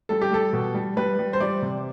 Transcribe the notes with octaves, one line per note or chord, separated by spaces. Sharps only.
G3 A4
G4
G3 A4
B2
G3
G3 B4
G3
C5
G3 D5
C3